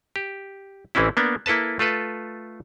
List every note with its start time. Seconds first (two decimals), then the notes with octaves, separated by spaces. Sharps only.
0.16 G4
0.95 A1 E3 C4 C#4 E4
1.17 A#3 B3 D4
1.46 A#3 E4 A4 B4 A5
1.79 A3 F4 A4 B4